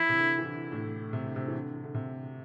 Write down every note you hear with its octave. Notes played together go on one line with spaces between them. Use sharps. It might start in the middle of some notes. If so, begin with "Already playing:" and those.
Already playing: E3 E4
C3
D3
E3
D3
A2
C3
D3
C3
E3
D3
D3
C3